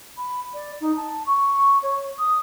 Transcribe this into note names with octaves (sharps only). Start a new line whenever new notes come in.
B5
D5
D#4
A5
C#6
C#5
D#6